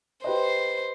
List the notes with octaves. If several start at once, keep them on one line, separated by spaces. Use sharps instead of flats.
G4 B4 C5 D#5